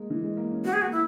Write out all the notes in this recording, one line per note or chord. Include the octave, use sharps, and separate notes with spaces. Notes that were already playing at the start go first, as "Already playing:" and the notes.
Already playing: G#3 A#3
E3
G#3
A#3
C#4
B3 F#4
G#4
A#3 F#4
E4